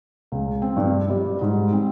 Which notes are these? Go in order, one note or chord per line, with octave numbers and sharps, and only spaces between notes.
C#2
C4
G2
G3
G#2
C4